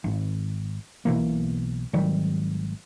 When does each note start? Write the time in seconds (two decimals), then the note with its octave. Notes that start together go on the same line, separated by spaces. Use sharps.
0.04 G#1
1.05 B1 B2 E3 A#3
1.93 G#1 D#3 F#3 G3